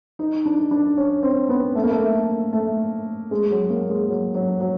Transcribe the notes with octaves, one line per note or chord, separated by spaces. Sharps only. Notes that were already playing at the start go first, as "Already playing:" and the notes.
D#4
D4
D4
C#4
C4
B3
A3
A#3
A3
A3
G#3
F#3
A#3
G#3
F#3
F#3
F#3